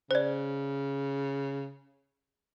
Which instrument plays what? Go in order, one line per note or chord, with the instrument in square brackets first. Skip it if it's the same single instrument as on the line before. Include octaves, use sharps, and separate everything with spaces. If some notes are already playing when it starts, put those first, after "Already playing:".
[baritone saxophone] C#3 [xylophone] C5 D5